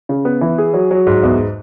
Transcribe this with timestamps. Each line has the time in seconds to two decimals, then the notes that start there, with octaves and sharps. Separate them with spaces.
0.09 C#3
0.25 B3
0.41 E3
0.58 G#4
0.74 F#3
0.91 F#3
1.07 G#2
1.23 E2